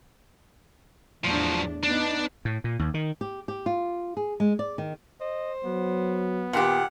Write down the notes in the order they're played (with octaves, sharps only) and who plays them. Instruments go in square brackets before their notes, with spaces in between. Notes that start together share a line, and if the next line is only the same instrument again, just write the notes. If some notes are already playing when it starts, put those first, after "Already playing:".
[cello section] E2 A2 D4 [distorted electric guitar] F3 F#3
[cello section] B3 D#4 [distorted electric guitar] D4
[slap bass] A2
A#2
D#2
D#3
[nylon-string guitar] G4
G4
F4
G#4
G#3
D5
D#3
[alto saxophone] C5 [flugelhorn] D#5
[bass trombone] F#3 [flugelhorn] B3
[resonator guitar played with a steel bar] A#2 D#3 G4 [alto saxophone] F#5